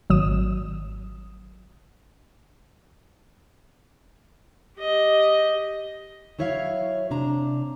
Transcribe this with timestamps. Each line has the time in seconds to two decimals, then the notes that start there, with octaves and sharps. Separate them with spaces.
0.10 G#1 F#3 D#6 E7
4.78 G4 D#5
6.39 F#3 E4 C#5 E5 F5
7.11 C3 D4 A#5